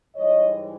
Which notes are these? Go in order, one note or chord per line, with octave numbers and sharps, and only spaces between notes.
G#2 E3 G3 C#5 D#5